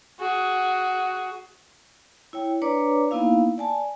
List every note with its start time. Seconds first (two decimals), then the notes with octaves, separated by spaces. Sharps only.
0.19 F#4 G#4
2.33 E4 C#5 G5
2.62 D4 B4 C#5 D5 A#5 D6
3.11 A#3 B3 D#4 E4 F5
3.58 D5 G#5 A5